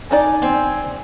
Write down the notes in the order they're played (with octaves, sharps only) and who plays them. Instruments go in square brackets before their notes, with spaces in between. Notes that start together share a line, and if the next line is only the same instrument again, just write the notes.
[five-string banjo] D4 D#4 D5 [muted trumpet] G#5
[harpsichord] C4